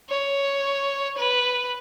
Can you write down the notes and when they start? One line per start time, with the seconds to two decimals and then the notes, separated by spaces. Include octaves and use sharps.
0.09 C#5
1.17 B4